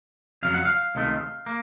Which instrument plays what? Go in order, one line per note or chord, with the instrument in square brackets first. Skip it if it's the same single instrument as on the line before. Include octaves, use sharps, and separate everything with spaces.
[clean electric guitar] F2 C#3 F#3 F5
F#5
F5
C#2 C3 D#3 A3
A#3